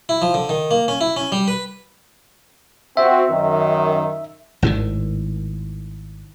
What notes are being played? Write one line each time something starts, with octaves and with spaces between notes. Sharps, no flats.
E4
F3
D3
D#3
A#3
C#4
E4
C#4
G3
B4
C4 F#4 E5
F#2 D#3
G#1 A2 C3 D#3